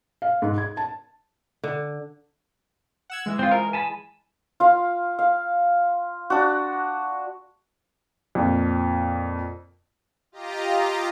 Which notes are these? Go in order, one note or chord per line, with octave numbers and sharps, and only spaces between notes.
F5
G#2
G#6
A5
D3
F#5 E6 G#6
E3 G#3
C4 F4
A#4
G#5 A5 B5
F4 F5
F5
D4 F#4
F2 A#2
F4 G4 D#5 A#5